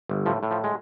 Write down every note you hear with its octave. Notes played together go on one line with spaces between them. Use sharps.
G1
A2 F3
A2
F3
G#3